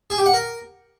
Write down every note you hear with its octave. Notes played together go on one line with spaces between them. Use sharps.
G#4
G4
F#5
A#4